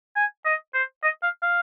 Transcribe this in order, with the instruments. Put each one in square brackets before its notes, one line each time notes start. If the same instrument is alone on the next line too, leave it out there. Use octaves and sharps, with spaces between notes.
[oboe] G#5
D#5
C5
D#5
F5
F5